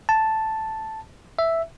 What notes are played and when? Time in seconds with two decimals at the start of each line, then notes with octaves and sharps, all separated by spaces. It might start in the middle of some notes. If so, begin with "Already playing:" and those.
0.09 A5
1.39 E5